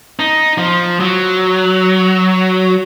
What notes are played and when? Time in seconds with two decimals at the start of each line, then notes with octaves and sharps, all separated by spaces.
0.19 D#4
0.58 F3
1.00 F#3